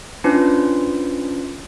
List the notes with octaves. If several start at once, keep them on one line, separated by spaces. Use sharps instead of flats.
C#4 D4 F4 B4 C5